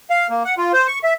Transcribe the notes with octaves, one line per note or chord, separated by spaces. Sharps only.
F5
A#3
F#5
F4
C5
C#6
E5